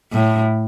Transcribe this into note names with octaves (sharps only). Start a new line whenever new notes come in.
A2